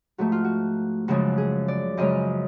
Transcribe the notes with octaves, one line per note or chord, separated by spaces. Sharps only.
G#2 F3 A3 F#4
F4
F#4
F#2 C#3 F3 G#3 F#4
G#4
D5
F#2 C#3 F3 G#3 D#5